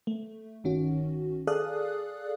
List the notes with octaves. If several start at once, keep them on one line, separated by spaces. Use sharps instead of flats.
A3
G1 D#3 C#4 F#4
G#4 A4 D5 F5 D#6 F#6